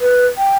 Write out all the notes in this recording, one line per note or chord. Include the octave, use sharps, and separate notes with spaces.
B4
G5